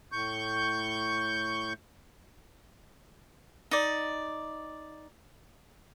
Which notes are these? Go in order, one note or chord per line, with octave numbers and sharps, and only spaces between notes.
A2 C#6 G6
D#4 D5